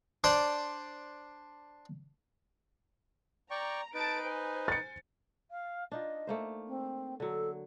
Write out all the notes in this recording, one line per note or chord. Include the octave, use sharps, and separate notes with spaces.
D4 C5 D5
D5 G5 A#5 C#6
D#4 B4 A5 A6 D7
C5 G#5
A6 C#7
F5
D4 D#4 F4 D#5
A3 A#3 C5
C4
D3 F#3 A4